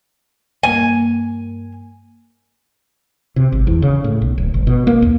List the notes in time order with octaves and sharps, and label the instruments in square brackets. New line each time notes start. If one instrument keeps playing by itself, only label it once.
[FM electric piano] G2 A#3 [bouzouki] G#5
[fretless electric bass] C3
G#1
E2
C#3
A2
B1
D1
G1
B2
A#3
D#2